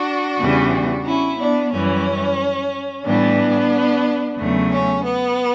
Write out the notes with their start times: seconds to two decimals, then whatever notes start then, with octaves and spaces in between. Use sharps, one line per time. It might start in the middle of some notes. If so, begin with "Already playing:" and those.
Already playing: D4 F#4
0.40 E2 C#3 E3 G3
1.06 C#4 E4
1.39 B3 D4
1.72 F#2 E3 G3 C#4
3.05 A2 E3 G3 B3 D4
4.38 E2 C#3 F#3 A3
4.71 C#4
5.04 B3